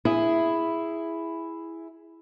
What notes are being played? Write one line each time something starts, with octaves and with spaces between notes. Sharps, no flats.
E4 G#4